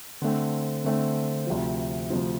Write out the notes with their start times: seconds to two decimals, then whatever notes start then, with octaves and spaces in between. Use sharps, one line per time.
0.22 D3 A3 C4
0.84 D3 A3 C4
1.47 D2 C3 F3
2.10 D2 C3 F3